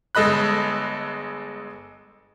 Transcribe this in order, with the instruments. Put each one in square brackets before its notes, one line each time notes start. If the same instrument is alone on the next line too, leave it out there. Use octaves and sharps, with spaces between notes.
[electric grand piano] G1 G#3 A4 D#5 B5 F#6